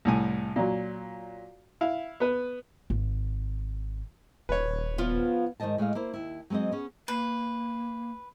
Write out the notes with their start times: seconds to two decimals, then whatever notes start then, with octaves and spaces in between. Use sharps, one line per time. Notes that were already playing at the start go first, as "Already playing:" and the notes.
0.05 C2 A2 G#5
0.56 A#2 F#3
1.81 E4 F5
2.20 B3 B4
2.90 G#1
4.49 D#1 B4 C#5
4.98 F3 B3 F4
5.60 G#2 D#3 F3 C5 D#5 A5
5.78 A2 G#3 D#5 F5
5.95 A#3 E4 C5
6.14 D#2 E4
6.50 F#3 G#3 C4 C5 D#5
6.72 B3 C#4 G#4
7.08 A#3 B4